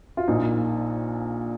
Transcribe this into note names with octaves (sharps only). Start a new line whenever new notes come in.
F4
A#1 A#2 D#4